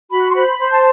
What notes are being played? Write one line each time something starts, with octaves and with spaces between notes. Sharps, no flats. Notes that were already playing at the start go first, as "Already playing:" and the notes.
F#4 B5
C6
C5 B5
C5
A5